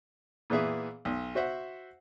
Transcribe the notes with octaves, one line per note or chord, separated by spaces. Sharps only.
A#2 E3 B3 G#4 E5
B1
F#4 C5 E5 F#5